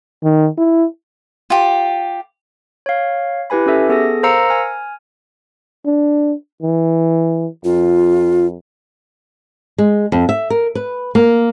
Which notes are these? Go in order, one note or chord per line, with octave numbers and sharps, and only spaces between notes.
D#3
E4
F4 G4
C#5 F5
E4 G4 B4 G#5 B5
C#4 G4 A4 E5
B3 G#4 A4 A#6
A#4 C5 F5 A#5 E6 C#7
G#5 F6
D4
E3
F2 F4
G#3
F2
E5
A#4
B4
A#3